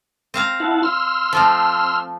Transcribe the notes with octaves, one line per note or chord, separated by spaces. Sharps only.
C4 F5 A#5
E4 F#5 A5
C6 E6 F6
F3 A3 C4